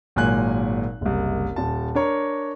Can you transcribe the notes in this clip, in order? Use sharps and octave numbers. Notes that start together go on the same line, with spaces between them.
G#1 A#2 F#3 G#3 G#5 F#6
F#1 C2
D#1 A5
D4 A#4 C#5 A#5